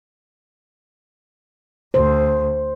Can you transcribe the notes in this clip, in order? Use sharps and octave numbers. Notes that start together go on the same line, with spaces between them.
D2 C5